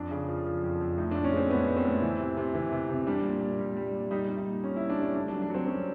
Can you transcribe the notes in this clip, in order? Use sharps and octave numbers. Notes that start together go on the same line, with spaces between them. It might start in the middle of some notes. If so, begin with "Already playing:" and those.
Already playing: F2 D4
C#3
F3
F3
F2
F2
A2 D#4
D4
A2
C#4
G#3 C4
A2 B3
A2
C4
A2
E3
C3
C3
E3
C3
C3
G3 D4
A#2
A#2
G3
G3
A#2
G3 D#4
G3
D#4
A#2
A#2 C#4
E4
A#2
D4
G3 C#4
A3 D4
D4
F#3
D4
F#3 C4
F#3 C#4